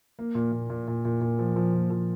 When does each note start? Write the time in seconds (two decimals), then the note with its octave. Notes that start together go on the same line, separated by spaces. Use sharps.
0.19 A#3
0.35 A#2
0.52 A#2
0.70 A#2
0.88 A#2
1.05 A#2
1.21 A#2
1.39 F3
1.56 F3
1.74 A#2
1.90 F3